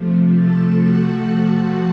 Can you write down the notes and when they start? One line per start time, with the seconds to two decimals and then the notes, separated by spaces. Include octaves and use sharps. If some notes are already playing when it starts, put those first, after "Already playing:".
Already playing: C3 F3 A3
0.36 A4 A5
0.83 F#4 F#5
1.29 A4 A5